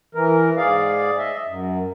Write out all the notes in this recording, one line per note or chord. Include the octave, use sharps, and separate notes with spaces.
E3 A#4
G#2 G#4 D5 F5
D#5 E5
F#2